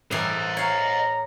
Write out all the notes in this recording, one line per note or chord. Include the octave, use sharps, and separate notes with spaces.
A2 E3 A#4 C5 D#5
C#5 F5 A#5